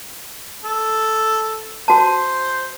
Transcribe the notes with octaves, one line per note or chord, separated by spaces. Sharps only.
A4
F#4 C5 A5